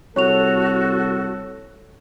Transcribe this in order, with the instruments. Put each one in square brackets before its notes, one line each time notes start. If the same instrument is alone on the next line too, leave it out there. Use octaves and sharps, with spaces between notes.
[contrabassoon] C2 [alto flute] F#4 [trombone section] A4 [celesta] C#5 C#6 F7